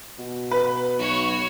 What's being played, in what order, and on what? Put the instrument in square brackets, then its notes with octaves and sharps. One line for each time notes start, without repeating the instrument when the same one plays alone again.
[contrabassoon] B2
[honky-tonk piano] B4
[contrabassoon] B1 [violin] F#4 C#5